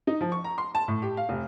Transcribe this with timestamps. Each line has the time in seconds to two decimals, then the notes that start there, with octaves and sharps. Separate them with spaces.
0.07 D#4
0.21 F3
0.32 C#6
0.44 A#5
0.58 C6
0.75 A5
0.88 A2
1.02 G4
1.17 F5
1.29 F1